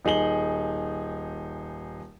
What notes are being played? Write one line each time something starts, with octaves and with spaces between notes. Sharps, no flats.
D#1 D#4 G#4 F#7 G7